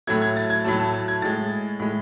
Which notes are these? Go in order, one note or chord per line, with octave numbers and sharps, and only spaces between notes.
A2 F#3 A3 G#6
G#6
A6
G#6
A2 F#3 A3 A5
A5
A5
G#6
A2 G#3 A6
A2 G#3